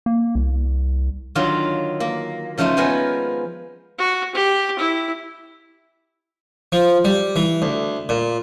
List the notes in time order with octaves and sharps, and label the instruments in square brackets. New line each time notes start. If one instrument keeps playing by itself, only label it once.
[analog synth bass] A#3
C2
[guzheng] D3 D#3 F#3 F4
A#3
C#3 F3 A3 D#4 C5
F3 G#3 B3 A#4 G#5
[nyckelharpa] F#4
G4
E4
[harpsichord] F3
G3
E3
D2
A#2